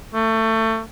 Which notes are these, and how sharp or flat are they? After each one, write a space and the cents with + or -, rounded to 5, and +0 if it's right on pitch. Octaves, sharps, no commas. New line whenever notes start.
A3 +25